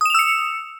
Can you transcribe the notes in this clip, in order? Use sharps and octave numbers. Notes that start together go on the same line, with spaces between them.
D#6 E6 C#7 E7 F7